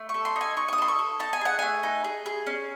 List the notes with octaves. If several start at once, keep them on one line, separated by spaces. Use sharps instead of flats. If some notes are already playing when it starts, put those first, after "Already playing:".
Already playing: A3
C#6
A4
C6
D#4
G#5
D#4 C#6
C#6
D#6
A4 C6
C#6
A4
D#4 A5
G#5
G#4 F#5
A3 G#5
D#4
G#4
G#4
C#4